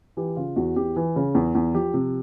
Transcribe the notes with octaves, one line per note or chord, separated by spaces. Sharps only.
E3 G4
C#3 F4
E2 F#4
E2 G4
E3
C#3
E2
E2
F3 G4
C3